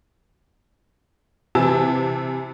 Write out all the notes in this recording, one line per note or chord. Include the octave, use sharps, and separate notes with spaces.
C3 E3 A5 E6